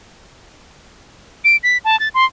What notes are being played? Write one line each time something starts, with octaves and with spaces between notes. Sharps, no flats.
D7
B6
A5
A6
C6